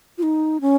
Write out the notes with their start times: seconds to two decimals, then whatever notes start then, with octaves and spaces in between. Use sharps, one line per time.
0.18 F4
0.23 D#4
0.61 C#4